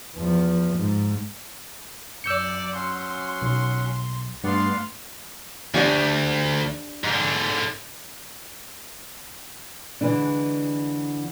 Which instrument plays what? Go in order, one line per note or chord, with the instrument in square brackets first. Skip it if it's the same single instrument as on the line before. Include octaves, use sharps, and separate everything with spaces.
[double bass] E2 F3
G#2
[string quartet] F#2 D5 [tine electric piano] E6 G6 C#7
[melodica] F#3 C#4 F#5 [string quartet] C6
[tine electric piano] B1
[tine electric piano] G2 [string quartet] A3 F5 C6 [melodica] B3 D5 F#5
[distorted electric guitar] D2 [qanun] D4 G4 G#5
[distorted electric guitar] G#2 D3
[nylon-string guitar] D3 E3 G#3 D4